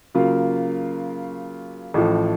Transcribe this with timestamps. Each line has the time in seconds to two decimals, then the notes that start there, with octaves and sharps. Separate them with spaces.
0.15 C#3 F#3 A#3 F4
1.94 A1 A2 F3